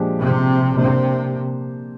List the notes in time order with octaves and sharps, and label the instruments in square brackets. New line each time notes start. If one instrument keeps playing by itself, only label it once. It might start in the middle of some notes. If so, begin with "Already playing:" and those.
Already playing: [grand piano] A#2 F3 G#3 D4 G4
[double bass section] C3
[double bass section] C3 [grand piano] A#3 D4 G4 C5